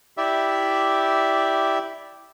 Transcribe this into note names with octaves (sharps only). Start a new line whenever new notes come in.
E4 G4 D5 E5